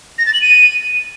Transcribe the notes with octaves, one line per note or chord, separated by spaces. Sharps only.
A#6
A6
F#7
D#7